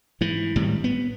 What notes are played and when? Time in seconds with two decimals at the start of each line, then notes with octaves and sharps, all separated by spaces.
0.21 G#2 E3
0.56 G#1 A2 G3
0.84 B3